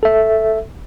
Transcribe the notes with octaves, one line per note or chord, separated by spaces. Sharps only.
A4 E5